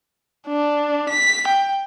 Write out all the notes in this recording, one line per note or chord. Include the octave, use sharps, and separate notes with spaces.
D4
B6
G5